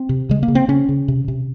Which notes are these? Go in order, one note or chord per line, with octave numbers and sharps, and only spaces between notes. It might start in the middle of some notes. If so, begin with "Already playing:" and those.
Already playing: C4
C3
C#3 G#3
A#3
C#3
C4
C#3 C#4
C#3
C3
C3